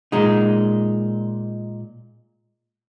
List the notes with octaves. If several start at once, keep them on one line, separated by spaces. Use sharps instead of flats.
A#2 G#3 D#4